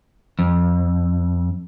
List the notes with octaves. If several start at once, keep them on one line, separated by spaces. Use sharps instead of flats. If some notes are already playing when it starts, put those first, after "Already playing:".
F2